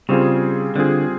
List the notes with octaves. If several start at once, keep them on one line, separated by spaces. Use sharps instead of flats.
C#3 G3 C4 F4 G#4
D3 G3 C4 F4 G#4